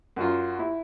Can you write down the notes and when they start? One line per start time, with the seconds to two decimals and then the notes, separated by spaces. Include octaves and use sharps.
0.16 F#2 F#3 F4
0.59 E4